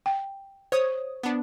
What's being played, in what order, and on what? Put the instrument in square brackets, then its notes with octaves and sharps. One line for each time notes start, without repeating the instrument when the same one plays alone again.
[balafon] G5
[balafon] C5 [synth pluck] C#5 D#6
[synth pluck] B3 D4